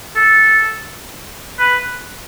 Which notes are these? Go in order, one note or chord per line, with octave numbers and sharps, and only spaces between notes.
A4
B4